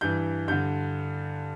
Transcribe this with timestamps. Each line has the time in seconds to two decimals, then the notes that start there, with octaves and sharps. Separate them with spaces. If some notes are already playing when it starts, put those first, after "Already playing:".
0.01 G2 E3 G6
0.48 G2 D3 G6